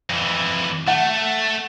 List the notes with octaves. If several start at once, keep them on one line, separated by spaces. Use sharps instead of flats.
F2 E3
A3 F#5